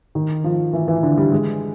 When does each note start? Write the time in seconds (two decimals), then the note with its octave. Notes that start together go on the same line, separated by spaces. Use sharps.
0.15 D#3
0.44 F3
0.73 E3
0.88 E3
1.03 D3
1.18 G3
1.32 G#3